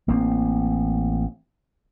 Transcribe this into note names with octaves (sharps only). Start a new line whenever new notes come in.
A1 A#3 C4